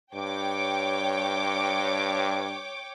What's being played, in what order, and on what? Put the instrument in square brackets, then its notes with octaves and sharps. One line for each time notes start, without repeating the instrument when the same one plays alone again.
[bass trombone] G2 [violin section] C#5 G5 D6